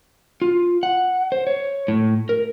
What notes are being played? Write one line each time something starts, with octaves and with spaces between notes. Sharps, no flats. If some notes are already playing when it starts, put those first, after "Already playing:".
F4
F#5
C5
C#5
A2
A#4